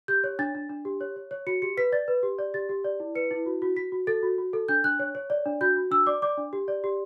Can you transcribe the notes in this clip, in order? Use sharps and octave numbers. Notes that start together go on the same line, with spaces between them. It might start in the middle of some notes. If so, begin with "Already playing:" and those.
G4 G6
C#5
D4 A6
D4
D4
G4
C#5
C#5
C#5
F#4 C#7
G4 C#7
B4 B6
D5 A6
B4
G4
D5
G4 A6
G4
D5
E4
B4 C#7
E4
F#4
F#4
F#4 B6
F#4
A4 A6
F#4
F#4
A4
D4 G6
D4 F#6
C#5
C#5
D5
D4
F#4 G6
F#4
D4 E6
D5 D6
D5 D6
D4
G4
D5
G4